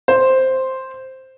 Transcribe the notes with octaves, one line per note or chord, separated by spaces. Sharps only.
C5